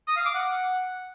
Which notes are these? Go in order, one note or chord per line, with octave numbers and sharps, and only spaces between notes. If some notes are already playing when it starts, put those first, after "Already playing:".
D#6
F5
D6
F#5